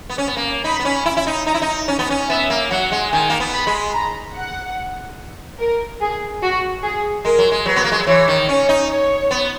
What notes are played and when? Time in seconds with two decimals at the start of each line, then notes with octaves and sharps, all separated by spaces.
0.10 B3
0.18 C#4
0.28 B3
0.37 A#3
0.64 D#4 B5
0.79 B3
0.85 C#4
1.06 E4
1.17 E4
1.27 D#4
1.46 D#4 A#5
1.54 E4
1.62 D#4
1.88 C#4
1.99 B3
2.10 C#4
2.30 B3 E5
2.50 A#3
2.71 F#3 F#5
2.92 G#3
3.12 D#3 G#5
3.30 A#3
3.40 B3
3.54 B5
3.67 G#3
3.94 A#5
4.36 F#5
5.60 A#4
6.01 G#4
6.42 F#4
6.83 G#4
7.25 G#3 A#4
7.38 F#3
7.51 G#3
7.65 F#3 B4
7.76 B3
7.84 A#3
7.92 G#3
8.00 F#3
8.07 E3 C#5
8.28 D#3
8.49 C#4 C#5
8.69 D#4
8.89 C#5
9.31 B3